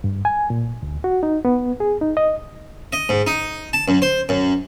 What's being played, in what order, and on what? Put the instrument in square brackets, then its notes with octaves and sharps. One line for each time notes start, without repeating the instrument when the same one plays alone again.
[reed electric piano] G2
G#5
A#2
D2
F#4
D#4
B3
G#4
D#4
D#5
[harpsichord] D#5
G#2
D#4
A5
F#2
C5
F#2